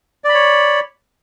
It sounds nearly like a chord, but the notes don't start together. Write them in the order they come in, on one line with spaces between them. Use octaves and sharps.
D5 B5 C#5